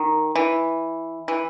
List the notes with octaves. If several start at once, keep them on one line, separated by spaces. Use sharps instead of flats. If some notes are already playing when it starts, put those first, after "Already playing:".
Already playing: D#3
E3
E3